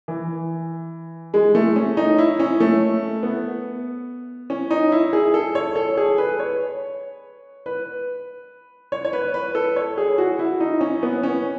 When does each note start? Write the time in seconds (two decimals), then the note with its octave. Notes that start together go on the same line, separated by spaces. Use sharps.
0.08 E3
1.34 G#3
1.55 A3
1.76 C#4
1.97 D#4
2.18 E4
2.40 C#4
2.60 A3
3.23 B3
4.50 C#4
4.71 D#4
4.92 E4
5.13 G#4
5.34 A4
5.55 C#5
5.76 A4
5.97 G#4
6.18 B4
6.40 C#5
7.66 B4
8.92 C#5
9.05 C#5
9.13 B4
9.34 B4
9.55 A4
9.76 C#5
9.98 G#4
10.18 F#4
10.39 E4
10.60 D#4
10.81 C#4
11.03 B3
11.23 C#4